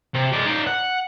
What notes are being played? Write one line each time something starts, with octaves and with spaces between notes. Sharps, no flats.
C3
G#3 D5
D#4 D5
F#5